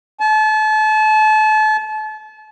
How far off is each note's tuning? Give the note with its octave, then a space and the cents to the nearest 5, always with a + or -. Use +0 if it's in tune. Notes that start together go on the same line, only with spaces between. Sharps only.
A5 -35